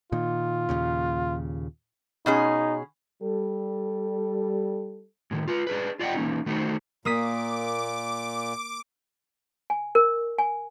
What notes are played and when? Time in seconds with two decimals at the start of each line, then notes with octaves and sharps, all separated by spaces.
0.12 A#2 D#3 F4
0.69 D#2 A#2 C#3
2.26 B2 C#4 D#4 G#4
3.23 G3 A4
5.31 A2 D3 D#3
5.48 F4 B4
5.67 D4 G#4 B4
5.99 F4 D5 D#5 F#5 G5
6.15 E3 A#3 C#4 D#4
6.46 D#3 A3 D#4 F#4 C5
7.05 A#2 A#3 D6 D#6 B6
9.70 G#5
9.95 A#4
10.39 G#5